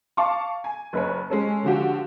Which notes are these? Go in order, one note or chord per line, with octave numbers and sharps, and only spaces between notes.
F5 A5 C#6 D6
G#5
F#1 B4 C#5
G#3 C#4 A4
D3 F3 F#4 G4